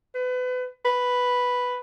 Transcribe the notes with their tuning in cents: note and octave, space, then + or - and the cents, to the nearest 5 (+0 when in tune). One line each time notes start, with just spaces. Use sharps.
B4 +30
B4 +0